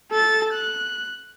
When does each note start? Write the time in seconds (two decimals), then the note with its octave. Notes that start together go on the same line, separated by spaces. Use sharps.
0.12 A4 A6
0.53 F#6